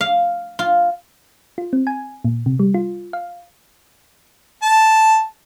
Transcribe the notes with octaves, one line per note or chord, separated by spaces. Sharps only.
F5
F4
F4
C4
G#5
A#2
C3
G3
F4
F5
A5